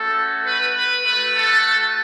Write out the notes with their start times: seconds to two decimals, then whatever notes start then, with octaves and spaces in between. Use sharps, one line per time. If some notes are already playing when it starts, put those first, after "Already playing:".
Already playing: A3 C#4 F#4 A4
0.45 B4
0.75 B4
1.05 A3 F#4 B4
1.36 A4